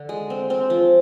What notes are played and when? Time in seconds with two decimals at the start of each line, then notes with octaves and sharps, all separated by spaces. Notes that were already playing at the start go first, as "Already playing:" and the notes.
Already playing: D3 D4
0.09 G#3
0.30 C4
0.50 C4
0.70 F3